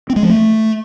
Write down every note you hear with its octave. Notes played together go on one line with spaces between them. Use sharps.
C4
G#3
F3
A3